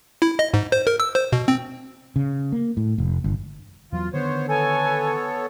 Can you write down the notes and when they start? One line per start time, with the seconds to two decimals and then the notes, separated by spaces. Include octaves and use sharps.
0.22 E4
0.39 D#5
0.54 G#2
0.72 C5
0.87 A#4
1.00 E6
1.15 C5
1.32 B2
1.48 C4
2.16 C#3
2.52 A#3
2.77 A2
2.98 F1
3.24 G1
3.92 E2 E3 F#3 F4
4.13 D3 D#3 B3 C5 C#5
4.49 B3 A4 C#5 G#5